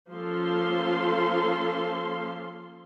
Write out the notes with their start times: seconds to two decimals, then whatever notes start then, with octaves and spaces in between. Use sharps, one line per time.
0.11 F3 A#3 C#4 A4 F5 C6